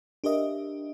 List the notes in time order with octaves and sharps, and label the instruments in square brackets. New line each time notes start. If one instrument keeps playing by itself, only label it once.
[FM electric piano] D4 G4 A#4 D#5 E5